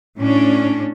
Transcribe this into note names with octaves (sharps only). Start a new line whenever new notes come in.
A2 C#4 D4